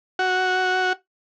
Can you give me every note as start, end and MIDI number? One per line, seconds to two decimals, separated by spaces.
0.19 0.93 66